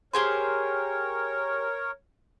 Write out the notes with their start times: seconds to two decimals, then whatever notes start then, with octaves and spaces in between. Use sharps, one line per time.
0.14 G4 G#4 A#4 C5 C#5